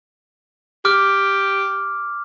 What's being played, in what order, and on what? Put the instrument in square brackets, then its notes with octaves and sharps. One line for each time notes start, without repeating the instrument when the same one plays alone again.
[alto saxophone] G4 [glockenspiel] D6 F6